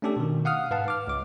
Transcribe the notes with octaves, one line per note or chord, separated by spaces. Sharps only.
A3 C#4 D4 G4 A4
B2 D#3
F5 F#5 D#6 F6
G#2 B4 F5 F#5 A5
D6 F6
C#2 D6